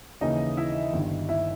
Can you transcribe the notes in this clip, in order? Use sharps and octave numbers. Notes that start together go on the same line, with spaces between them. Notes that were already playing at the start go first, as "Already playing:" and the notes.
D#2 C#3 E3 D#4 D#5
E4 E5
G1 G2 D#3
E4 E5